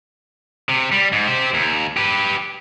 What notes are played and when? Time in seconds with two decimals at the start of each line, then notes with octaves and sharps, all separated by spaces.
0.69 C3
0.92 G3
1.13 G#2
1.27 G4 C5
1.54 D#2
1.97 G4 B4